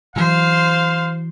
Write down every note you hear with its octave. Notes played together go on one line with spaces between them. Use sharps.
E3 F#3 C5 F5